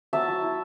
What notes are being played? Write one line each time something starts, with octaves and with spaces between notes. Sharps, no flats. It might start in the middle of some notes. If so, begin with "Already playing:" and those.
F#3 E5 A5
F#3
E4